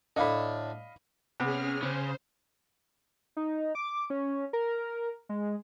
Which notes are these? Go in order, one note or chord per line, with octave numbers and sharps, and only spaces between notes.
A2 D3 D#5 F5 B5
C3 B3 C#4 G#4 F6
C#3 C5
D#4
D6
C#4
A#4
G#3